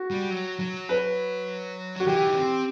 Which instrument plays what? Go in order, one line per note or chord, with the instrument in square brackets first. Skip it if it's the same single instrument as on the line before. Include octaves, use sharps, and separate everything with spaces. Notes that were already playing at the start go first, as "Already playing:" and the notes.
Already playing: [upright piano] F#4
[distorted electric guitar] G3
F#3
F#3
[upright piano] B4
[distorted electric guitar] F#3 [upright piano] F#4
[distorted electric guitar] E3 [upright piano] G4
[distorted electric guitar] D#4
C4